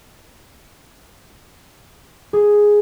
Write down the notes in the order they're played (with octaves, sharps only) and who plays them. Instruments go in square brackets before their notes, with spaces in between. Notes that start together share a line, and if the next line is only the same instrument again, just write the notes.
[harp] G#4